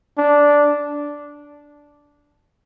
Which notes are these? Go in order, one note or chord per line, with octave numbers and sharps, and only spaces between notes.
D4